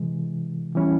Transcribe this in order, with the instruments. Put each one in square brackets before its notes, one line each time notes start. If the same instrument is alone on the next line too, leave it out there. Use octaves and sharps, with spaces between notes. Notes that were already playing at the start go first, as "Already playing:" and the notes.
Already playing: [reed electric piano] C3 E3 G#3
E3 G3 C#4 E4